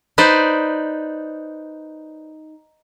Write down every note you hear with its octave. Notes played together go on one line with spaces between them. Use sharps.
D#4 B4 C5 D5